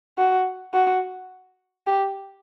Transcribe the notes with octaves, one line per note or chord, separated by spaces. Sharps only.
F#4
F#4
G4